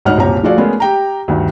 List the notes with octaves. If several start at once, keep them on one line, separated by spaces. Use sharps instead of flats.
D2 G#2 D#4 C#5 F#5 F6
F#1 C2 A#2 G4 C#5 A#5
F3 A3 F#4 G#4 D5 F5
G#3 A3 B3 C#4 G#4 A#4
G4 G5 A#5
D2 G2 D#3